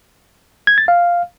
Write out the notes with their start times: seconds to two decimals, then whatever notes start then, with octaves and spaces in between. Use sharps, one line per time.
0.67 G#6
0.78 A6
0.88 F5